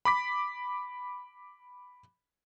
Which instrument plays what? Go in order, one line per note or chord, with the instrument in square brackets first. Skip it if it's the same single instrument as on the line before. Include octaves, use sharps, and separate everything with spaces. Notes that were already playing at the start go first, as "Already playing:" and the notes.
[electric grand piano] B5 D6 B6